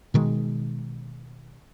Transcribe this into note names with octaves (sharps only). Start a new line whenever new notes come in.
B2 D#3 G#3